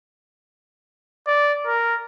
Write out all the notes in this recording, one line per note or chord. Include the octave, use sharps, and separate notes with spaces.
D5
A#4